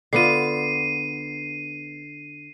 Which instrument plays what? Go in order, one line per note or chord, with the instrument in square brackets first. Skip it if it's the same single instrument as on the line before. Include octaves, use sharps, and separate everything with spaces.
[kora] D3 B3 F4 [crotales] C7 D#7